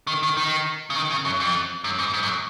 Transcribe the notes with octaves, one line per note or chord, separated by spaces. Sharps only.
D#3
D#3
D#3
C#3
D#3
C#3
F#2
F2
F#2
G#2
G#2
F#2